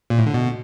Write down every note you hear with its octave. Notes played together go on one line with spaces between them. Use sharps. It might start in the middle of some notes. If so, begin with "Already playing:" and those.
A#2
A2
D3
B2